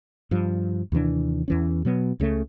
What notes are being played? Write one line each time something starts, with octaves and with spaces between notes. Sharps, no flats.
G2 F3
D#2 C3 E3 D4
E2 E3 C#4
B2 F#3 B3
C#2 C#3 F#3 A3